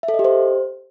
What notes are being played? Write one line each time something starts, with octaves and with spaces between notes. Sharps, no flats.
E5
A4
D#5
G4
C5